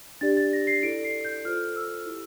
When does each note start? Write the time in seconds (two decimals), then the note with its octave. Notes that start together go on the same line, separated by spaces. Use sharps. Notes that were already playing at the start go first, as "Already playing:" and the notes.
0.21 D4 G4 D5 A6
0.37 A6
0.53 A#6
0.67 C7
0.83 E4 A4 D5 D7
1.04 C7
1.25 G6
1.45 F4 A4 C5 F6
1.76 E6
2.06 E4 G4